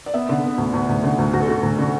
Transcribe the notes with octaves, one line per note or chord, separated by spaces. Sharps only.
D5
B3 E5
D3
B3
D2
D2
D2
D3
D2
D2 F#4
A4
D3 F#4
D2
D3